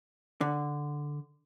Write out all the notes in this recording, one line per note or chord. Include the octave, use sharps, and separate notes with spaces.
D3